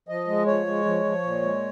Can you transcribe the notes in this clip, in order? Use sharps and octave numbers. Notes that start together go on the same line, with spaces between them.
F3 D#5
G#3
F3 C#5
G#3
F3
F3
A#2
G#3